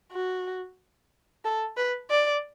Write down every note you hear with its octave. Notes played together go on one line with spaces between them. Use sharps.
F#4
A4
B4
D5